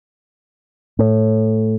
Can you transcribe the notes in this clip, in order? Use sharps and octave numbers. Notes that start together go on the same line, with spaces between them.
A2